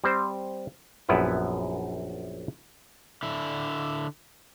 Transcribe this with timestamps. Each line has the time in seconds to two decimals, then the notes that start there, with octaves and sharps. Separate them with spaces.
0.04 G3 C4 C5
1.08 A#1 F#2 B3 E4 B4 G5
3.23 D3 E4